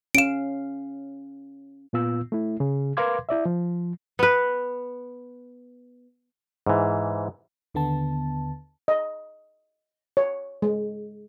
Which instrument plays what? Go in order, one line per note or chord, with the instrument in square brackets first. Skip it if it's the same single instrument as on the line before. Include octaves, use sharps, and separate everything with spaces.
[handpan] C#4 F5 [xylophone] D7 E7
[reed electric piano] A#2 B3 F4 E6
A3 E4
C#3 G#4
A#4 B4 F5 C6 D6 G#6
E4 D5 E5
F3
[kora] B3 B4
[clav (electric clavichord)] G#2 E3
[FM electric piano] D#2 D3 B3 A5
[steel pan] D#5
C#5
G#3